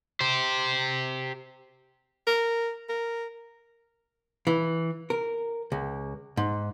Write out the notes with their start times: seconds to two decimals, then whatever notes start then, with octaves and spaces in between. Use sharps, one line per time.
0.20 G4 C5
2.27 A#4
2.89 A#4
4.47 E3
5.10 A#4
5.72 C#2
6.37 G#2